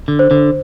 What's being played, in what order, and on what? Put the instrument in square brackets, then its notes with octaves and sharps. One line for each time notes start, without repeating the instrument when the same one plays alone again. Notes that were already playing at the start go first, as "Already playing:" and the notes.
[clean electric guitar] D3
[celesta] C5
[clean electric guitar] D3